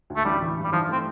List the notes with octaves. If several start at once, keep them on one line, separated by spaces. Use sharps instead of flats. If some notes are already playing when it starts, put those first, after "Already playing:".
D2
A3
A1 G3
E3
G2
G3
E3 F3
A3 C4